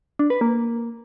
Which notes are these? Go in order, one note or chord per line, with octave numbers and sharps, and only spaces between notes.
D4
B4
A#3